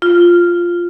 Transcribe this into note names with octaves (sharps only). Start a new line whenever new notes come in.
F4